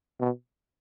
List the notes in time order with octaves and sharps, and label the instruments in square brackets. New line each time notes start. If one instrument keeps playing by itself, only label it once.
[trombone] B2